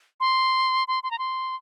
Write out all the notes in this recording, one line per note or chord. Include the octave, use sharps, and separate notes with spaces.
C6
C6
C6
A#5
C6